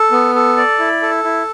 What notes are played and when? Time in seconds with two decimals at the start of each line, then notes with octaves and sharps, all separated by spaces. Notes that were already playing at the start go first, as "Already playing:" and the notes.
Already playing: A4
0.12 B3
0.35 A4
0.57 D5
0.79 E4
1.02 A4
1.24 E4